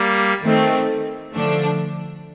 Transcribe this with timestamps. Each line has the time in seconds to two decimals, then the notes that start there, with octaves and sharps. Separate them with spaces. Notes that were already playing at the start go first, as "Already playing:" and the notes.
Already playing: G3 A#3
0.43 D#3 A3 C4
1.32 D3 F3 A3 D4